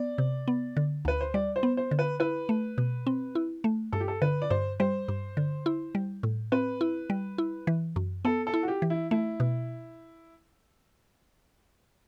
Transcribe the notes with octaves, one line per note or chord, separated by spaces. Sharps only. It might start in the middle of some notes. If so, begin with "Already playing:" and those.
Already playing: B3 D5
C3
B3
D3
D2 B4
C5
G3 D5
C5
B3
C5
D3
B4
E4 B4
A3
B2
C4
E4
A3
G2 A4
G4
A4
D3 B4
D5
G2 C5
G3 C5
G2
D3
E4
G3
A2
C4 B4
E4
G3
E4
E3
F#2
B3 A4
A4
E4
F#4
G4
E3
E4
A3 E4
B2